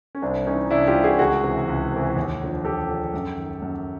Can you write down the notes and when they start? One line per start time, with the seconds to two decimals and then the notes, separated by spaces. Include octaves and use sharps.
0.15 C#4
0.22 C2 C4 D4
0.46 C3 E3 C#4 D#4
0.70 C2 D4 E4
0.87 F4 G4
0.95 C3 E3
1.04 F#4 G#4
1.19 C#2 F#4 G#4
1.43 C3 E3
1.67 C#2
1.92 C3 E3
2.16 D#2
2.41 D3 F3
2.64 D#2 G4 A4
2.89 D3 F3
3.14 F#2
3.38 D#3
3.62 F#2